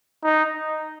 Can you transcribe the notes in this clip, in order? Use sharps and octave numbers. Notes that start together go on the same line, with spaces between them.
D#4